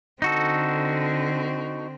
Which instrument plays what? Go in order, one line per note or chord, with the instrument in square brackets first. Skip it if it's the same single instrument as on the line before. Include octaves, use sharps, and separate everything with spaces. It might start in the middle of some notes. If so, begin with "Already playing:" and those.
[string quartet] D3 C4 [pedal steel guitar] D#4 F#4 A4